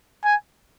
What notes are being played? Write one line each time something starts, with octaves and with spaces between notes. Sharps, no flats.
G#5